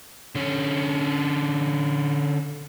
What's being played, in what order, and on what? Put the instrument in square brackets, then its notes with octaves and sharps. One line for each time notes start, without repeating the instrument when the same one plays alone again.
[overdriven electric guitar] D3 C#4